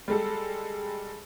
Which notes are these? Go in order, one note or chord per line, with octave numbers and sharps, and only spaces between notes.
G3 G#3 A4